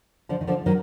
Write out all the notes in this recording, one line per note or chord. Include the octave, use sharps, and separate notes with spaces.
D3 F3
D#3
D3 F3
D#3 F#3